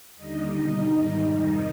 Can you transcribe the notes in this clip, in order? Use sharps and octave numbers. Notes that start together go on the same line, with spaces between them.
D#2 D3 G3 D#4 D#5
B2 G3
G#2 D#3 G3 D#4 D#5
F2 C3 D#3 G3 D#4 D#5